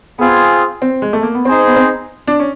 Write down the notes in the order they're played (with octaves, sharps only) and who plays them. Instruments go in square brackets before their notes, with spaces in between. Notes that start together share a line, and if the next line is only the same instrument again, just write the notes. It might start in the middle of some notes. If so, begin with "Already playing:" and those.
[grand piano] B3 [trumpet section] C4 F4 G#4
[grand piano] C4
G#3
A3
A#3
B3
[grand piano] C4 [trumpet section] D#4 G#4 C5
[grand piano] B3
C4
D4
C#4